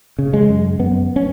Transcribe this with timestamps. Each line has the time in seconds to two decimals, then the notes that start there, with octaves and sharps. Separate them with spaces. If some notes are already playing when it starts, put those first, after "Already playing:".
0.19 C#3
0.33 G#3
0.49 F#2
0.79 F#2 B3
1.16 C#4